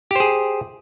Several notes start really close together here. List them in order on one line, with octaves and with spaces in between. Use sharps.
G4 C5 G#4